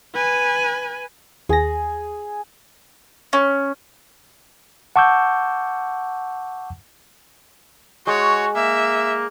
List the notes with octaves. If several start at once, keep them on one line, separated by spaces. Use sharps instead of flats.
B4 G#5
D#2 G#4 A#6
C#4
F#5 A5 C#6 D6 E6 G6
G#3 F#4 C#5
A#3 E5